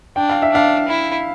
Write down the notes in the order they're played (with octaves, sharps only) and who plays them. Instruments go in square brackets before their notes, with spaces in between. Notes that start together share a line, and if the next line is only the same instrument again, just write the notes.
[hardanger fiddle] D4 [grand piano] G5
[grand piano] F5
E5
[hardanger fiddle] D4 [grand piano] F5
[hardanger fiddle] E4